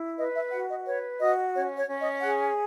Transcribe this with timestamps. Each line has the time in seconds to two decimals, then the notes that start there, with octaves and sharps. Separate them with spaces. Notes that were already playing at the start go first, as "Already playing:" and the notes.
Already playing: E4
0.18 B4 D#5
0.35 E5
0.52 F#4 F#5
0.69 D#5
0.86 B4 C#5
1.20 F#4 D#5
1.54 C#4 C#5
1.77 C#5
1.88 C#4
2.00 D#5
2.22 G#4 F#5